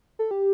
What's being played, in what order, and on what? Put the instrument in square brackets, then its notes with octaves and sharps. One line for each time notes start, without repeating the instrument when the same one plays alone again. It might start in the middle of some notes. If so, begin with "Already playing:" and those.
[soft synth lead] A4
G4